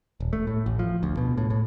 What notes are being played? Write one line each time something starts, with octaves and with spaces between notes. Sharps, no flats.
D#1
A3
A2
A1
F3
D2
B2
A2
A2